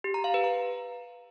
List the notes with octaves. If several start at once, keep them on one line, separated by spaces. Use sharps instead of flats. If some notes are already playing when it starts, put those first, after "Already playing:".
G4
A#5
F5
B4
A#5